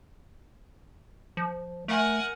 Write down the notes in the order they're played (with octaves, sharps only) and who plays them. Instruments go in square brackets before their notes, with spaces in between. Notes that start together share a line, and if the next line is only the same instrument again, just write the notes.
[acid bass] F3
[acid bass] A3 [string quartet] A#4 F#5 G#5